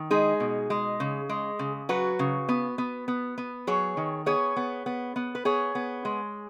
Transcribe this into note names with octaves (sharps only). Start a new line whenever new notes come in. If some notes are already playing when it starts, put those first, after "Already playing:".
Already playing: D#3
G#3 D#4 G#4
B2
G#3
C#3
G#3
C#3
F#3 F#4 B4
C#3
B3
B3
B3
B3
F#3 G#4 C#5
D#3
B3 G#4 C#5
B3
B3
B3
B4
B3 G#4 C#5
B3
G#3